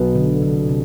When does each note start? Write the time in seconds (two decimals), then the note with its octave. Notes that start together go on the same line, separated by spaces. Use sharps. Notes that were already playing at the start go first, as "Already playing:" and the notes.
Already playing: B1 B2 B3
0.15 D3
0.42 C3
0.69 C3